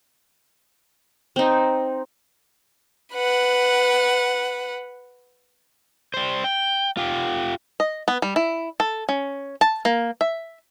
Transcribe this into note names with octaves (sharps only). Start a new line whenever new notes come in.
C4 D#4
B4 F#5
G3 C5
G5
F4 G4
D#5
B3
G3
E4
A4
C#4
A5
A#3
E5